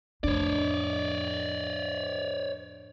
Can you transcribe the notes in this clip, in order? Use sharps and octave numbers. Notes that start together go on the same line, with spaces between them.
F2 A2 D4 C#5 D5